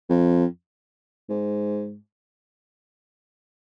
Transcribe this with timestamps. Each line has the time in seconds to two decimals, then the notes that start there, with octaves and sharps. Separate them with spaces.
0.09 F2
1.29 G#2